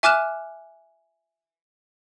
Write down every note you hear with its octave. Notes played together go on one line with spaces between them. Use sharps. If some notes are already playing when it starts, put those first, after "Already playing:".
E5 G#5 D6 F6 F#6 E7